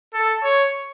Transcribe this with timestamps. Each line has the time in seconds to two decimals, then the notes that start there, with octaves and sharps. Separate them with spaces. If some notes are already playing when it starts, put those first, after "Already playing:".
0.14 A4
0.43 C#5